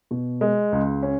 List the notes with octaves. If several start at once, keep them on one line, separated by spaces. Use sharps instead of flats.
B2
G#3
C#2
C#4